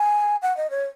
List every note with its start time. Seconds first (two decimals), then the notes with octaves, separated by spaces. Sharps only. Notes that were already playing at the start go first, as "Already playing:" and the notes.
Already playing: G#5
0.42 F#5
0.57 D#5
0.70 C#5